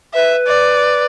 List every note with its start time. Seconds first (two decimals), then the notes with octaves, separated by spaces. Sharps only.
0.14 B4 E5
0.47 D5